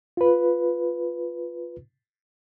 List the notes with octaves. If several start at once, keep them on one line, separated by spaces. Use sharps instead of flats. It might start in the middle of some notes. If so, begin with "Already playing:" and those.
F4 B4